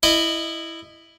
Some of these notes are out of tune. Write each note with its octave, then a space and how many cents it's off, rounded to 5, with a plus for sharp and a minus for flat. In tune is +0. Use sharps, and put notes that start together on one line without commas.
E4 +0 D#5 -20